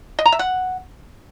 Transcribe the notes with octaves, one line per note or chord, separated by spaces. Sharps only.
D#5
A#5
E5
F#5